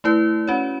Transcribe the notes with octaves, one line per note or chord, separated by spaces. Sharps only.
A3 E4 B4
C#4 F#4 C#5